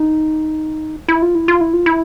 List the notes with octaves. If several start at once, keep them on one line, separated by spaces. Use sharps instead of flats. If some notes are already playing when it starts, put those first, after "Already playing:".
Already playing: D#4
E4
F4
E4
F4
E4
F4
E4